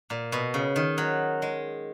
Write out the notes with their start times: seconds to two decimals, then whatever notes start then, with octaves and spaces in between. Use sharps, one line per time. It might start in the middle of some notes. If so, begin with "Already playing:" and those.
0.10 A#2
0.32 B2
0.54 C#3
0.76 D#3
0.98 F#3
1.42 G#3